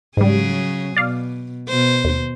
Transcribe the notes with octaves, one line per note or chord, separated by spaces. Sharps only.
G#2 C#3 F#3 G3 G#4
B2 D5 F5
B2 C5
D#2